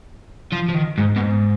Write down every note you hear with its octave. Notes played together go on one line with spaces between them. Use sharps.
F3
F3
D#3
G#2
B2
G#2